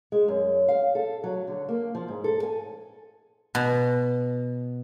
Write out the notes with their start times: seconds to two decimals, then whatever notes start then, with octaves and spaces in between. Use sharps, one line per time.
0.12 G#3
0.28 F#2
0.68 F5
0.95 A4
1.24 F#3
1.47 D3
1.69 A#3
1.95 F3
2.08 G#2
2.24 A4
2.43 G#5
3.55 B2